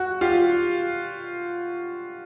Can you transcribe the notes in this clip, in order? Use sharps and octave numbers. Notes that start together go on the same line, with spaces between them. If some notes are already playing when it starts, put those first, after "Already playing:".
Already playing: F#4
F4 G4